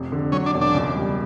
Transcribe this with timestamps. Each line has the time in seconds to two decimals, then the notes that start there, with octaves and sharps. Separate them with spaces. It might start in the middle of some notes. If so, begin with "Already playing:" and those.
Already playing: F1
0.12 D3
0.32 F#3 C#4
0.46 D4
0.54 E1
0.61 D4
0.74 C#2
0.95 G3